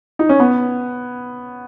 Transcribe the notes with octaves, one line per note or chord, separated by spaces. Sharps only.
D#4
C#4
B3